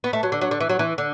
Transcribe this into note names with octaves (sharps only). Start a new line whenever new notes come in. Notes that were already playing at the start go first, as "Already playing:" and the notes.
B3
A3
F#3
D3
F#3
D3
E3
F#3
E3
D3